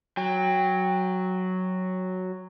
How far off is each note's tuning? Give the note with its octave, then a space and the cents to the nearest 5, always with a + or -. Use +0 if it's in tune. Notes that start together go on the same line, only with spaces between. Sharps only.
F#3 +0 G5 +20